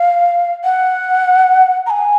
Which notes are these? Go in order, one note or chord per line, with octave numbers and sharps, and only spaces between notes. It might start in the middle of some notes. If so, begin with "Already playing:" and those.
Already playing: F5
F#5
A#5
G#5